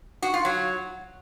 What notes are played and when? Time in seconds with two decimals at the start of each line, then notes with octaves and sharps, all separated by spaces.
0.22 F#4
0.34 F4
0.45 F#3